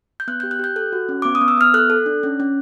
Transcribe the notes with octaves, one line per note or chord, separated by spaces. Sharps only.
G6
B3 F#6
G4 G6
F#6
G4 G6
A4 F#6
F#4
C#4
B3 D6
D#6
B3
E6
B3 F6
A4 F#6
A4
D4
C#4
C#4